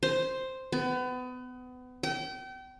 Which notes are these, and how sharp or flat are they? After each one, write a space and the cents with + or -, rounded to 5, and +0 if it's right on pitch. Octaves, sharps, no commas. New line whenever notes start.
C5 +0
B3 +30
G5 -35